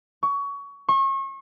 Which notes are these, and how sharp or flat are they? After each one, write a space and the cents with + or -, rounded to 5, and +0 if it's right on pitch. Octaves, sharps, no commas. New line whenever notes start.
C#6 +25
C#6 -35